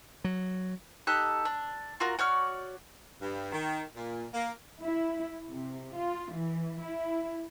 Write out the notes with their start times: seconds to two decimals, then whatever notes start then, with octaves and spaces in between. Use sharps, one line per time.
0.24 F#3
1.07 D#4 G4 A4 F#6
1.45 D4
2.00 F4 F#4 A#4
2.19 F#4 C#5 D5 F6
3.21 G2
3.52 D#3
3.96 A#2
4.34 A#3
4.80 E4
5.50 C3
5.96 F4
6.34 E3
6.83 E4